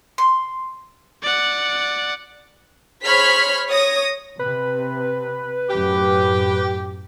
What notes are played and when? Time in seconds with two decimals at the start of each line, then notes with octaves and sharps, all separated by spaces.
0.18 C6
1.23 D5 F#5
3.04 G#4 C5 C#5 B5 F6 B6
3.69 C#5 D#6 A#6
4.39 C3 B4
5.70 F#2 A2 G4